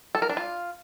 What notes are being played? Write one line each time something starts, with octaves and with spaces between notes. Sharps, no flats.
A4
A#4
D4
F4